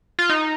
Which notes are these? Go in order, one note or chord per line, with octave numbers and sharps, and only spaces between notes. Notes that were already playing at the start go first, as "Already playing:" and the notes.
F4
D#4